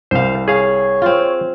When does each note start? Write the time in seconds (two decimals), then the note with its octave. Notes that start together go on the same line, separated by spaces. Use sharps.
0.11 C2 C5 F5
0.48 G#4 C#5 F5
1.02 C4 F4